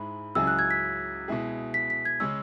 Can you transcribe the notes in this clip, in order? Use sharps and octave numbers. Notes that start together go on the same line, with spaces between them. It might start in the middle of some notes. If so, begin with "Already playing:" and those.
Already playing: G#2 G#3 E4 B5
C#2 C#3 F#3 E4 G#4 E6
F#6
G#6
B6
B2 G#3 E4 G#4
B6
B6
G#6
C#3 G#3 C#4 E6